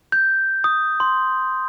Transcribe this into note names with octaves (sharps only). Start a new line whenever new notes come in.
G6
D#6
C6